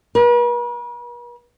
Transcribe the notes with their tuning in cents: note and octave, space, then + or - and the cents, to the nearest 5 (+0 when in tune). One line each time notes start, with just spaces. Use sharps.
B4 -45